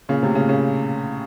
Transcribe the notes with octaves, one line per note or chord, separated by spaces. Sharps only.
A#2 C#3
A2 C3
A#2 C#3
A#2 C#3